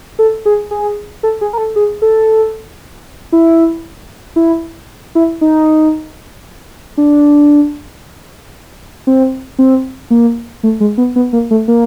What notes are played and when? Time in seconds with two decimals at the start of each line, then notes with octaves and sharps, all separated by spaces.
0.19 A4
0.45 G#4
0.71 G#4
1.23 A4
1.41 G#4
1.53 A#4
1.58 A4
1.76 G#4
2.02 A4
3.32 E4
4.36 E4
5.15 E4
5.41 D#4
6.98 D4
9.07 C4
9.59 C4
10.10 A#3
10.63 A3
10.80 G#3
10.98 B3
11.16 B3
11.33 A#3
11.51 A3
11.68 A#3